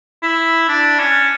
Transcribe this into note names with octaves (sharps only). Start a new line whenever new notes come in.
E4
D4
C#4